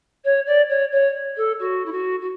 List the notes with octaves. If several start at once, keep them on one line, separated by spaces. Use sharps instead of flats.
C#5
D5
C#5
C#5
A4
F#4
E4
F#4
F#4